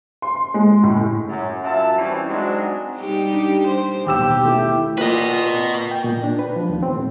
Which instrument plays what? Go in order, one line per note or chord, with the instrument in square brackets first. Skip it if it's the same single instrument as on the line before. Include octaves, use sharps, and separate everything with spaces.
[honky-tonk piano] C6
G#3
A2
[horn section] F#2
F#2 F4 E5 A5
E3 G3 C4 C#4
F#3 G#3 C4 D4 D#4 F#4
[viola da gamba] G3 D#4 G4
[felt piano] D4
[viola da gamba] C5
[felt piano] D#2 E6 E7 [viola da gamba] B2 [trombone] G4
[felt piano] A3 E4
[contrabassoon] A#2 [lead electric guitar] B4 D#5
[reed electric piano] G5
A#2
D4
B4
F3
D#2
C4
A2